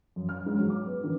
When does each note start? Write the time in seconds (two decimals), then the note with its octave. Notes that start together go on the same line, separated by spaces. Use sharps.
0.16 F#2
0.29 F6
0.46 G#2
0.58 F#3
0.70 D6
0.86 B3
1.04 D#3